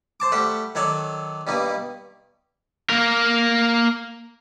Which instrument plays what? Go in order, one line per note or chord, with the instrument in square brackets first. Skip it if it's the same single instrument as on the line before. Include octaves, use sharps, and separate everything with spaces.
[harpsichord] C5 A5 D6
G3 A3 G4 F#5
D#3 F#3 A4 C#5 D5
G2 B2 G3 A#3 D#4
[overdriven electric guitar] A#3 A#4